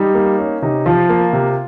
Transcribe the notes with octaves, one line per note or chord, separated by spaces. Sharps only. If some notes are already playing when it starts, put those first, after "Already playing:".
Already playing: G3 D#4
A#3
C#4
C3 D#4
F3 F4
A#3
C3